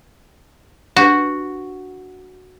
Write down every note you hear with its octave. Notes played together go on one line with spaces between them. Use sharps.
D4 F#4 G4 B4